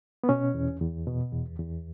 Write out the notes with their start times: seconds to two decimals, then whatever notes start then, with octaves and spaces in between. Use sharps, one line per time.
0.24 B3
0.29 B2 C#4
0.54 E2
0.82 E2
1.07 B2
1.33 E2
1.59 E2